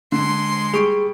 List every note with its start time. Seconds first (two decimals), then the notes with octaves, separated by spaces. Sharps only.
0.12 D3 G#3 C6
0.74 G3 G#4 C#6 D7